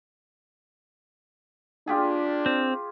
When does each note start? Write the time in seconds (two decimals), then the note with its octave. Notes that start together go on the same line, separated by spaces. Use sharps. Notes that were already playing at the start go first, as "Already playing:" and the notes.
1.87 D4 F4 G4 G#4
2.46 C4